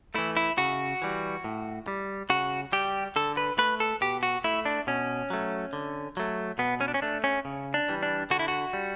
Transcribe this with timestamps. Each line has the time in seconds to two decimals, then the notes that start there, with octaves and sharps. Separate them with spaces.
0.15 E3 A3 E4
0.37 E4
0.58 C#3 F#4
1.02 E3 G3
1.44 A2
1.88 G3
2.30 C#3 F#4
2.72 G3 G4
3.16 D3 A4
3.37 B4
3.58 A3 B4
3.80 A4
4.01 B2 G4
4.23 F#4
4.44 A3 E4
4.65 D4
4.87 B2 C#4
5.30 F#3 A3
5.73 D3
6.17 F#3 A3
6.59 B2 B3
6.81 C#4
6.88 D4
6.94 C#4
7.02 A3 D4
7.24 C#4
7.45 C#3
7.74 D4
7.89 E3 G3
8.03 D4
8.30 D3 F#4
8.39 E4
8.48 F#4
8.73 G3